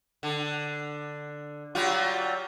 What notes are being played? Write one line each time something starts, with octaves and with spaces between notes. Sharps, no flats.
D3
F#3 G3 F4